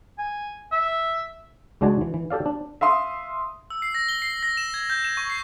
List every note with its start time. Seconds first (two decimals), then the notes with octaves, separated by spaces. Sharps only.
0.18 G#5
0.72 E5
1.81 C#2 G#3 D4 F#4 D5 G#5
2.01 E3
2.14 E3
2.30 G4 A4 D5 F5
2.46 D4
2.81 E5 F5 C6 D#6
3.70 E6
3.82 C7
3.94 A#6
4.08 G7
4.22 C7
4.43 A#6
4.57 E7
4.74 G#6
4.90 G6
5.05 E7
5.17 C#6
5.30 C7